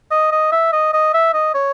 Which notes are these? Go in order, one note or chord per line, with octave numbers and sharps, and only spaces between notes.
D#5
D#5
E5
D#5
D#5
E5
D#5
C#5